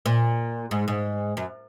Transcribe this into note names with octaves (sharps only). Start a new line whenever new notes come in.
A#2
G#2
G#2
F#2